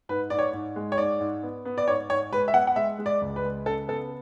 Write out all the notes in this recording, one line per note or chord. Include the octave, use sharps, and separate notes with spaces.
G#2 B4
G#2 D5
C#5
G#2
G#3
C#5
G#2 D5
G#2
B3
B3
D5
G#2 C#5
G#2 C#5
G#3 B4
E5
B3 F#5
F#5
G#3 E5
G#3
D5
C#2
B4
G#3
C#3 A4
B3 A4